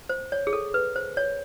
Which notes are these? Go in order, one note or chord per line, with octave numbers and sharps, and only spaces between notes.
C5
C#5
G#4
A4
B4
C5
C#5